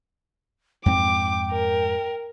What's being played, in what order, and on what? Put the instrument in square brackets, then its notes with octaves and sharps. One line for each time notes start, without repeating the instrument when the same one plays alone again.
[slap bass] F2 G#2 C4 [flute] G5 [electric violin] D6
[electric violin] A#4